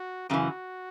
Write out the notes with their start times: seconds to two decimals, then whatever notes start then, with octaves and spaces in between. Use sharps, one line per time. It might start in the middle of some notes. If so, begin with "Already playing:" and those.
Already playing: F#4
0.29 F#2 C#3 E3 F#4